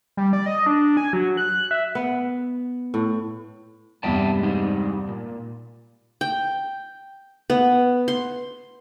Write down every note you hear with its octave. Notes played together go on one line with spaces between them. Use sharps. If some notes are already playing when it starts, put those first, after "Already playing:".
G3
D5
D#5
D4
G#5
F#3
F#6
E5
B3
A2
E2 G2 C3 G3 E5 G5 A5
G#3 D#4
A#2
G5
B3
C6